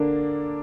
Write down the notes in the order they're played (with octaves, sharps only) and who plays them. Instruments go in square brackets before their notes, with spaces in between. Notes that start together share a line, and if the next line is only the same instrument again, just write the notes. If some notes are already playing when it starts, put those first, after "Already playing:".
Already playing: [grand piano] D3 A#3 D4